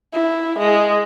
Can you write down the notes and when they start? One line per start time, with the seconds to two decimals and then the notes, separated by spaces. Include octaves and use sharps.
0.13 E4
0.59 G#3